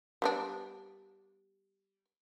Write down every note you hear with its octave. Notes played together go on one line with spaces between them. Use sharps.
G3 B3 D4